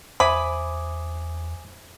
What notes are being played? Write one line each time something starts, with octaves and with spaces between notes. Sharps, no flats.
E2 C5 E5 G#5 B5 D6 D#6